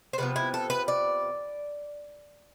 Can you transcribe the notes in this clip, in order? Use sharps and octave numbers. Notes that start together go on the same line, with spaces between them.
C5
C3 F3 B3 B4
E4
A4
B4
D5